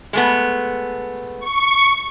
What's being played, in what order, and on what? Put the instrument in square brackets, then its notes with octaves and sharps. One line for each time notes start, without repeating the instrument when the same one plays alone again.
[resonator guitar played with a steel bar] G#3 A3 B3
[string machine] C#6